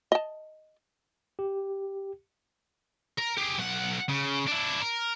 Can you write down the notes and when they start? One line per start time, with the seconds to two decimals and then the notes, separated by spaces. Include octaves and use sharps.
0.12 D#5 A5
1.39 G4
3.18 A#4
3.38 G4 G#4
3.59 B1 F#5
4.09 C#3
4.47 D4 E4
4.81 A#4